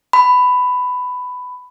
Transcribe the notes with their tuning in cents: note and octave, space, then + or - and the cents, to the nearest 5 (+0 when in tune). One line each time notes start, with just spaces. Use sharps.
B5 +15